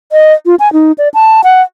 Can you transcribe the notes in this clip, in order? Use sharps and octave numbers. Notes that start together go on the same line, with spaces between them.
D#5
F4
G#5
D#4
D5
A5
F#5